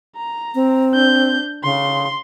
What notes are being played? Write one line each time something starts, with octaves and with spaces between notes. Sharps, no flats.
A#5
C4
D4 G6
C#3 C6